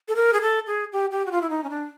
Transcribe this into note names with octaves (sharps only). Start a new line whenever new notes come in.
A4
A#4
G#4
A4
G#4
G4
G4
F#4
F4
E4
D#4
C#4
D4